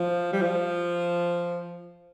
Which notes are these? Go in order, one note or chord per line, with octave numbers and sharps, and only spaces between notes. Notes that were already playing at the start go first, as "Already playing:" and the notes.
Already playing: F3
G3
F3